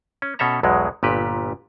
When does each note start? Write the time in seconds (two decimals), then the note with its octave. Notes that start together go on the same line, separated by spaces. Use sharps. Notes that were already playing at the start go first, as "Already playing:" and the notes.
0.22 C#4
0.39 B2 C#4 A4 E5 A#5
0.63 B1 E2 B2 F#3 G#3
1.03 G1 A#2 G4 B4